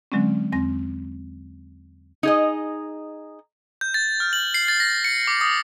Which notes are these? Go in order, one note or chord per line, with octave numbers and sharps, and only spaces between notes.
D3 F#3 G#3 C4 C#4
E2 C4 A#6
D#4 G#4 D#5
G6
A6
F6
F#7
C7
A6
A#6
C#7
D6
D#6